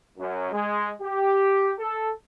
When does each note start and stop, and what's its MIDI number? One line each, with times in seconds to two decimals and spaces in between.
0.18 0.49 42
0.52 0.90 56
1.01 1.71 67
1.79 2.10 69